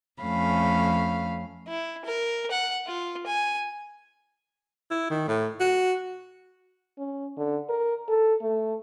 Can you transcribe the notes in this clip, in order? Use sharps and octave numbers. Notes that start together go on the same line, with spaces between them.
F2 A3 C#4 F5 B5
E4
A#4
F#5
F4
G#5
E4
D#3
A2
F#4
C#4
D3
A#4
A4
A3